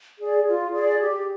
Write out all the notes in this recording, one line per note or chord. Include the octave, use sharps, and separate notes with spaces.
G#4 D5
F4
G#4 D5
G4